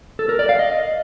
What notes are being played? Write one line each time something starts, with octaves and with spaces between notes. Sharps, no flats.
A4
A#4
D5
F5
D#5